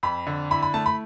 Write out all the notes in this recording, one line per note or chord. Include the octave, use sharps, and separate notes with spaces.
F2 B5
D3
E4 B5
B5
A3 A5
B5